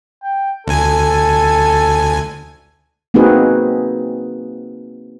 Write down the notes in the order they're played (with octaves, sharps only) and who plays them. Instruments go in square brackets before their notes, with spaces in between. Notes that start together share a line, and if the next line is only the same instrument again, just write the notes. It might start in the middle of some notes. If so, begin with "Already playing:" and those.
[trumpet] G5
[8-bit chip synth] D2 G#5 [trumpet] A4
[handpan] A#3 C4 D#4 F#4 G#4 B4